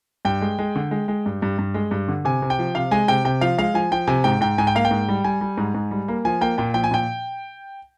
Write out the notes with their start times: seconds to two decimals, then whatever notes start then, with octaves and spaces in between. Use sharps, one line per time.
0.25 G2 G5
0.41 G#3
0.59 G#3
0.76 D3
0.91 G#3
1.08 G#3
1.26 G2
1.42 G2
1.59 G2
1.74 G#3
1.91 G2
2.08 D3
2.25 C3 G#5
2.42 C3
2.50 G5
2.59 F3
2.75 C3 F5
2.91 G#3 G#5
3.08 C3 G5
3.25 C3 G5
3.41 F3 F5
3.58 G#3 F5
3.74 F3 G#5
3.91 F3 G5
4.07 C3 G#5
4.24 G#2 G5
4.41 G#2 G5
4.58 G#2 G#5
4.67 G5
4.75 A#3 F5
4.85 G5
4.91 G#2
5.08 G3
5.24 G3 G#5
5.41 G3
5.57 G#2
5.74 G#2
5.91 G3
6.08 A#3
6.25 F3 G#5
6.41 A#3 G5
6.58 A#2 G5
6.74 F3 G5
6.84 G#5
6.91 A#2 G5